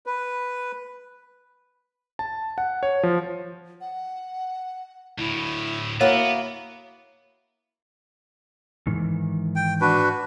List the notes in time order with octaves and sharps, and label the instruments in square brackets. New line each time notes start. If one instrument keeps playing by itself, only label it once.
[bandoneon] B4
[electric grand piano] A5
F#5
C#5
F3
[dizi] F#5
[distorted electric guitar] D2 A2 [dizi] E4
[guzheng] A#3 E4 F#4 [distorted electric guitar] B3 [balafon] C#5
[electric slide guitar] G#2 D#3 E3
[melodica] G5
D4 F#4 B4